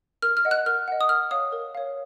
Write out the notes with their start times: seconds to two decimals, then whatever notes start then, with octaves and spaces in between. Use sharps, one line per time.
0.22 A#4 F6
0.37 F6
0.45 D#5 F#5
0.51 F#6
0.66 A#4 F6
0.88 D#5 F#5
1.01 D#6
1.09 A#4 F6
1.31 C#5 F5 D#6
1.52 A#4
1.75 C#5 F5